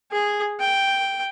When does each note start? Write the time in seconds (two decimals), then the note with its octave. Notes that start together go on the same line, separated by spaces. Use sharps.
0.12 G#4
0.60 G5